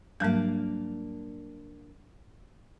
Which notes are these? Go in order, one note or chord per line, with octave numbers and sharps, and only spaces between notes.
G#2 F#3 G3 A#3 D4